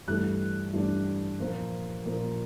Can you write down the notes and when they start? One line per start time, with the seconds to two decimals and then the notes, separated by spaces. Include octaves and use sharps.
0.08 G2 E3 A3 D4 F#6
0.73 G2 E3 A3 D4
1.39 A#2 F3 A#3
2.06 A#2 F3 A#3